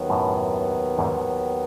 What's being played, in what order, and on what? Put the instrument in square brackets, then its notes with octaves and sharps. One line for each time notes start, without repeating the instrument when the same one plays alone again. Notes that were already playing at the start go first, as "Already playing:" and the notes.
Already playing: [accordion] D#2 D#3 F#3 B3
[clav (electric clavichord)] F#2 A2
E2 G#2